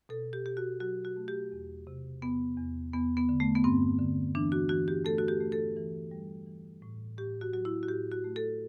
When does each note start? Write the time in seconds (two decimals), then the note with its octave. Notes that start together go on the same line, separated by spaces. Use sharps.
0.09 B2 A4
0.33 G4
0.45 B2 G4
0.57 F#4
0.80 F#3 F#4
1.05 F#4
1.17 A3
1.28 G4
1.52 E2
1.87 C3
2.22 E2 B3
2.57 E2
2.93 E2 B3
3.17 B3
3.29 D3
3.40 A3
3.55 B3
3.64 G2 C4
3.99 D3
4.35 E3 D4
4.52 F#4
4.69 E3 F#4
4.88 G4
5.05 A3 A4
5.18 F#4
5.28 G4
5.41 A3
5.52 A4
5.77 E3
6.11 G3
6.46 E3
6.82 A2
7.17 A2 G4
7.41 F#4
7.53 F#3 F#4
7.65 E4
7.83 F#4
7.88 A2 G4
8.12 F#4
8.24 A3
8.36 A4